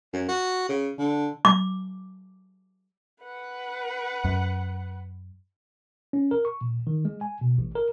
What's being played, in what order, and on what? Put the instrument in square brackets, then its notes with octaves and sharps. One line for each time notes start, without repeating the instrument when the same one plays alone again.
[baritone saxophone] F#2
F#4
C#3
D3
[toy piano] D6
[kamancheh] B4 F#5
[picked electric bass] F#2
[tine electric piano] C#4
A#4
C#6
A#2
D#3
G#3
G#5
B2
A1
A#4